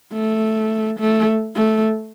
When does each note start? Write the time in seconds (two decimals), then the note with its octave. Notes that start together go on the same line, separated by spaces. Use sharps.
0.13 A3
1.00 A3
1.56 A3